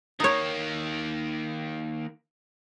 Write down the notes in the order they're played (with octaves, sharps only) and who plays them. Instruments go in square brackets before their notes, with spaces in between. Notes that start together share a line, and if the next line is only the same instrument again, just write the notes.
[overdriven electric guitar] D#3 A#3 [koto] D#4 C#5